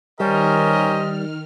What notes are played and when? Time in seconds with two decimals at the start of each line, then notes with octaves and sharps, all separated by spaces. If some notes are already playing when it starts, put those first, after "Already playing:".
0.20 D#3 G3 C#4 G4 A#4 C5 D#5 F6